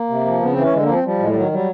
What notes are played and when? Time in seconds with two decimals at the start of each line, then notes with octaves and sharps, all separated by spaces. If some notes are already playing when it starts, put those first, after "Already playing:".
Already playing: A#3
0.09 C3
0.25 F3
0.41 C#3 B3
0.52 E3 C4
0.63 C#4
0.72 D3 G#3
0.83 A#3
0.88 F3 C4
1.04 F3 G3
1.19 A2 G#3
1.29 G3
1.35 D#3 F#3
1.52 F#3 G3